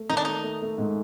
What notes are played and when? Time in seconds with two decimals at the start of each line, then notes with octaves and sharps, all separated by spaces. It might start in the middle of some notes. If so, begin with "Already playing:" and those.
Already playing: A3
0.09 D#3 D#4
0.17 D4
0.25 A3 D#4
0.43 A3
0.62 A3
0.78 G#2